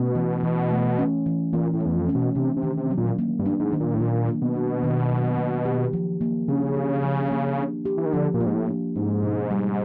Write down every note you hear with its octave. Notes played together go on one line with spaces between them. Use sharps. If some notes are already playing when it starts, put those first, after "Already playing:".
Already playing: B2 A3 C#4
E3
E3
A3
C#4
E3
A#2 E3
A2
A3
E2
F2
C#4
B2
C3 D4
C3
D#3
C3
F#3
A#2
A#3
G2
D4
G#2
D#3
A#2
A2
A#2 F#3
A#3
B2
D4
D#3
F#3
A#3
G4
F3
A#3
C#3 D4
G4
F3
A#3
D4
G4
E3
D#3
D3 F3
A#2
A#3
G#2
A2
D4
G#2 C#4
B2
G3